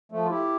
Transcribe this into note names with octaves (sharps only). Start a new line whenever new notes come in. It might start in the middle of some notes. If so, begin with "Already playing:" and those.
F3 A3
F4
E4 G4